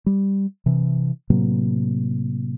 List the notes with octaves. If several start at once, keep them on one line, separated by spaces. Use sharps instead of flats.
G3
C3 E3
A2 C3 F#3 A#3